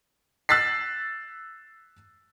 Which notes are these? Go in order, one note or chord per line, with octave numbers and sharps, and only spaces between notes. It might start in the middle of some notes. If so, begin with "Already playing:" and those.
E6 F#6 A6 B6 C7